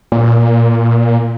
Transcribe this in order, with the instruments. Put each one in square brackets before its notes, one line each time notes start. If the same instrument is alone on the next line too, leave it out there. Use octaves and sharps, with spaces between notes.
[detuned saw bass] A#2